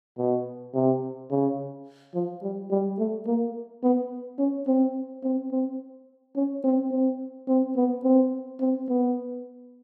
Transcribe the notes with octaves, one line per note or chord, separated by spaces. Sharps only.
B2
C3
C#3
F3
G3
G3
A3
A#3
B3
C#4
C4
C4
C4
C#4
C4
C4
C4
B3
C4
C4
B3